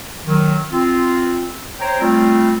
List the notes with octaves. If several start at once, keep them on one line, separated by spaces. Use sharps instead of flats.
D#3 F#3
C4 F4
C5 C#5 G5 A#5
G3 A3 C4 F4